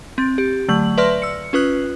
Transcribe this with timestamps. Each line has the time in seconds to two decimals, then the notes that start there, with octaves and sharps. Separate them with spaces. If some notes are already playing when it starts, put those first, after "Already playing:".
0.18 C4 A6
0.38 G4
0.68 D3 F#3 A3 G6 F#7
0.98 B4 D5 E5 C6 F6 A#6
1.22 E6 C#7
1.53 C#4 F4 B4 D#6 F#6